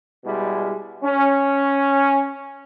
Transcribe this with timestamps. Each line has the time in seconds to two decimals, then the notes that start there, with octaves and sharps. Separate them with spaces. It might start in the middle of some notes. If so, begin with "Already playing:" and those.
0.25 B2 G3 G#3 E4
1.03 C#4